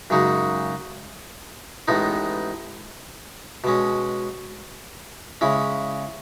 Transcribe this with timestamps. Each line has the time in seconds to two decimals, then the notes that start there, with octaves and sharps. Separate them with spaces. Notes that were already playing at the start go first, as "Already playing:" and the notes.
0.10 F#2 C#3 G#3 D#4 F#4
1.88 A1 A2 G#3 B3 D#4
3.64 B2 G#3 C#4
5.41 C#3 G#3 C#4 E4